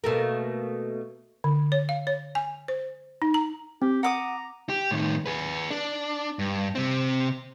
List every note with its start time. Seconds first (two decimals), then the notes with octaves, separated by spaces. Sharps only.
0.04 B2 A3 A#3
1.44 D3
1.72 C#5
1.89 F5
2.07 C#5
2.35 G#5
2.68 C5
3.22 D#4
3.34 A#5
3.82 C4 G4
4.03 F#5 A#5 D6 D#6
4.69 G4
4.91 A2 D#3
5.26 G#4 B4
5.71 D4
6.39 G2
6.75 C3 C4